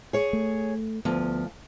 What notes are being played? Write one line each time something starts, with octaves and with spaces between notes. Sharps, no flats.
G#4 C#5
A3
D2 F3 B3